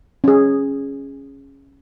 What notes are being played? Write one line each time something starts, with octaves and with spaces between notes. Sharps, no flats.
C#4 G#4